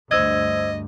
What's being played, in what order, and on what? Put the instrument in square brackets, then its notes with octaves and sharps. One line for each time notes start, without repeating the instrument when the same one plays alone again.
[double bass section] D2 G2 [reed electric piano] C5 E6 G#6 [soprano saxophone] D#5